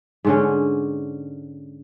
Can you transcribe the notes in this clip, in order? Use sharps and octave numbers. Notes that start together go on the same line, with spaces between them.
G#2 D3 C#4